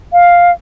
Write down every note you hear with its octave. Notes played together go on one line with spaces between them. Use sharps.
F5